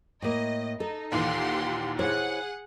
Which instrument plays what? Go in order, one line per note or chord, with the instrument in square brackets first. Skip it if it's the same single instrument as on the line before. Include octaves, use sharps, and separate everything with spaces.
[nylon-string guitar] A2 A#3 [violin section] D#5
[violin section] D#4 [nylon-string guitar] A4
[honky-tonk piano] D#2 A#2 E3 [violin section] G4 F#5 C6
[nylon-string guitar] E4 C5 C#5 [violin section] G#4 F#5